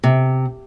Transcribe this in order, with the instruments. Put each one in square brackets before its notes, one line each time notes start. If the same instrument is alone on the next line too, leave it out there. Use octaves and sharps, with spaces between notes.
[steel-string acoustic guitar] C3